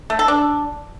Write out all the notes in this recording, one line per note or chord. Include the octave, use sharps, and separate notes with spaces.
A3
A4
D4